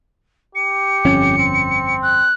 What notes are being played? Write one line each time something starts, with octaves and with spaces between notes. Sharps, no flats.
G4 C#7
G1 F2 C#4
C4
F#6